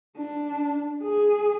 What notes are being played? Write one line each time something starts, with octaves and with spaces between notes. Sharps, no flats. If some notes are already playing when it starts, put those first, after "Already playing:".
D4
G#4